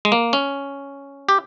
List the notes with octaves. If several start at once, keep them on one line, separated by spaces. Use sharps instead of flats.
G#3
A#3
C#4
G4